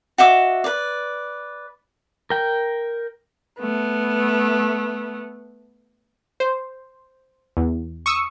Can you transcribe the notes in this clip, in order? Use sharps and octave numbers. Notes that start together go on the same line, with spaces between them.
F#4 D#5 E5 D6
B4 D5
A#4 G5
A3 B3
C5
E2
C#6 D#6 E6